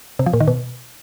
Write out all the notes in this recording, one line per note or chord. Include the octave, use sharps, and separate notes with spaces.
C3
F3
A#2
D#3
B2